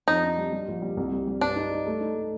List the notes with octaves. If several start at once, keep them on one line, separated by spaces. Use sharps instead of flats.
F2 D#4
D4
G3
G3
A#1
G3
C2
G3
G3
G2 D4
D#4
D#4
A3
D#4
A3